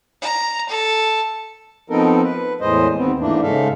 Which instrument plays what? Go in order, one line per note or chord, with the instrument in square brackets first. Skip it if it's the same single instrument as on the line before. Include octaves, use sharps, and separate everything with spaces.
[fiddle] A#5
A4
[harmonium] F3 B3 C4 D#4 A4 A#4
B4
E2 A2 G#3 C5 D#5
D#2 B3 C4
G#2 E3 A3 A#3 D4
G#2 C#3 G#3 A4 E5 F5